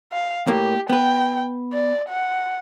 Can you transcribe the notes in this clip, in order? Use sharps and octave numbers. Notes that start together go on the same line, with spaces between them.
F5
A2 A#3 G4
B3 B4 G5
D5
F#5